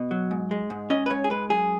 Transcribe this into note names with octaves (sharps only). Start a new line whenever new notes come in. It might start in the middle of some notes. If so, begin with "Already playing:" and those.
Already playing: B2
F#3
G#2
G#3
G#2
C#4 D#5
B4
G#2 C#5
G#4
G#3 B4
F#2 G#4